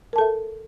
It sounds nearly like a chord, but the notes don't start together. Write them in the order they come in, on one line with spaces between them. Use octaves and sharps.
A#4 A5 A4 E5